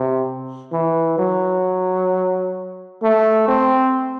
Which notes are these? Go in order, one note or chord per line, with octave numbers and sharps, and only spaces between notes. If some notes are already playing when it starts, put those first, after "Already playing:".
Already playing: C3
E3
F#3
A3
C4